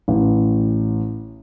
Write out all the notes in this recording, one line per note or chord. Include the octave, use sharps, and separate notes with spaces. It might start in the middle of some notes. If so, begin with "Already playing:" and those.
A1